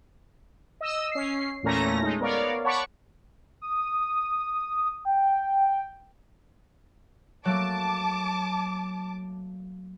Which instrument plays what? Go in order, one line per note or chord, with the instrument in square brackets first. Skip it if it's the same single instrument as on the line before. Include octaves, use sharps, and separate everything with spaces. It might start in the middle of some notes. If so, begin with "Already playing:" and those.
[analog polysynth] D#5 E6
C#4 C7
E2 A#2 A3 C#4 A#5 A#6
G#3 A3 D#4
B3 A#4 C#5 D5 F5
C#5 F#5 A5 B5 C#6 D6
[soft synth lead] D#6
G5
[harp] F#3 A3 A#3 [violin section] A5 D6